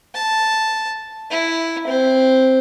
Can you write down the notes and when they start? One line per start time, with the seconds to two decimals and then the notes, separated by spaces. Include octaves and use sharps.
0.14 A5
1.30 E4
1.87 C4